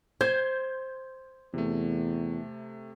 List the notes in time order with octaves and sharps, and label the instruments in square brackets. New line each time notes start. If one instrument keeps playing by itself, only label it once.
[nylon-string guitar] C5 [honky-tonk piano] G6 G#6
[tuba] E2 [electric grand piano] C3 A3